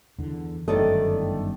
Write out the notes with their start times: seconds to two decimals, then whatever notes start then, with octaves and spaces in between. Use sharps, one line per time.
0.18 E2 D3
0.68 G1 F#2 D#3 A3 D5 D#5